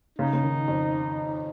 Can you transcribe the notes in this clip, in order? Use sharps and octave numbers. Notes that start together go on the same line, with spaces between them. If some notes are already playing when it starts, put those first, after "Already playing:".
C#3 D#4
C#3
D#3
F2